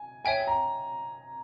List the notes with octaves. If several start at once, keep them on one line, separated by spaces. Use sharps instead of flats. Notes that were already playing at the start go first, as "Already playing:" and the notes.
Already playing: G#5
C#5 E5 G5 G#5
A#5